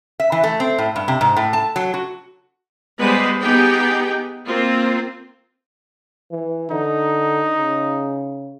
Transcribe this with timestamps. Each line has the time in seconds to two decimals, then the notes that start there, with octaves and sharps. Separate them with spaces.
0.20 E5
0.32 E3
0.44 A3
0.60 C4
0.79 A2
0.96 G2
1.08 C3
1.21 G#2
1.37 A2
1.53 A5
1.76 F#3
1.94 F#4
2.99 G3 G#3 B3 B4 C5
3.41 B3 D#4 G4 G#4 G5
4.46 A#3 C4 F4
6.31 E3
6.71 D3 D#4
7.57 C#3